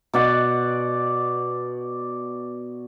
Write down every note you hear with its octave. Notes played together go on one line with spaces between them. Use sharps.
B2 D5 F#5